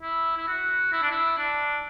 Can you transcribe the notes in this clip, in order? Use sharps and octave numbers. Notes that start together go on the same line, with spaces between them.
E4
E4
F#4
E4
D4
E4
D4